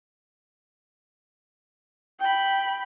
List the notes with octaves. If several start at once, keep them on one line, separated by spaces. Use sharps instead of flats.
G5 B5